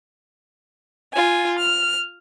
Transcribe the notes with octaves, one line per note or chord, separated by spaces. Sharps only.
F4 G#5
F6